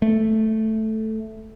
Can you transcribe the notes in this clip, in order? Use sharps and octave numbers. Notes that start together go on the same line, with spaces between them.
A3